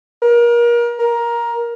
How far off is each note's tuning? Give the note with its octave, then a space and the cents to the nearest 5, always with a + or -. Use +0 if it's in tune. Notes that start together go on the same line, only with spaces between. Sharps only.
A#4 +30
A#4 +15